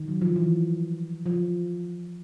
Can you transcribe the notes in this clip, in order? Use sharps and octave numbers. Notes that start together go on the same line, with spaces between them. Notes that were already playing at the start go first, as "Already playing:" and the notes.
Already playing: D#3
F#3
F3
E3
F3